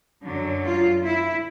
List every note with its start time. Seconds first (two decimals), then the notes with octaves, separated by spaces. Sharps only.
0.24 F#2 D3 F#3
0.64 F4
1.03 E4